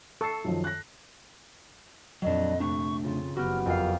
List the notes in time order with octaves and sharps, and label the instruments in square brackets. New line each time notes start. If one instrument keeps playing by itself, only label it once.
[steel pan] A4 [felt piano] C#6 C7
[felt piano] F#2 D#3 F3
F#6 A#6
[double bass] F2 A#2 [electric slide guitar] F#3 D4 [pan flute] D#5
[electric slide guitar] C3 A3 D4 [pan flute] C#6
[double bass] F2 C#3 [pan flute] F4
[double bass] F#1 F3 [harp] B3 [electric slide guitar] F#4 G4 [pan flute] F6
[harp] F2 F5 [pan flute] A#4